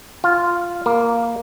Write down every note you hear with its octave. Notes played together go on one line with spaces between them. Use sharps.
F4
A#3